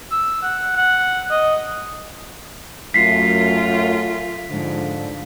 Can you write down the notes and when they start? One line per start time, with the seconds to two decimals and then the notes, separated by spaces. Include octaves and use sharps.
0.11 E6
0.43 F#5
0.76 F#5
1.31 D#5
2.94 F#2 A3 F4 B6 C7
4.51 G#2 D3 F3